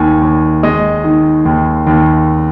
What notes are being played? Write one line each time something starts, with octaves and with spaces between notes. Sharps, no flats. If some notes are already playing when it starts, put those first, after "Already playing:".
Already playing: D#2 D#3 G#5
D#2
G#3 D#5
D#3
D#2
D#2